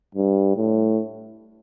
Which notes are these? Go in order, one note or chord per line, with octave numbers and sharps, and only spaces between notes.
G2
A2